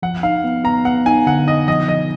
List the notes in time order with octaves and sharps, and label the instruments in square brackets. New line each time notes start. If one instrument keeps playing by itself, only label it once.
[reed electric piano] F3 [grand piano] F#5
[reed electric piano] D#4 [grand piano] F5
[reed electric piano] B3
[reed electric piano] B3 [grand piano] A#5
[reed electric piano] B3 [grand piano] F#5
[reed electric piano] D#4 [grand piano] G#5
[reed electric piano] D3 [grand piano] F#5
[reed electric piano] D#4 [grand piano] D#5
[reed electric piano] F3 [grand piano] D#5
[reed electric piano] F3 [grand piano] D#5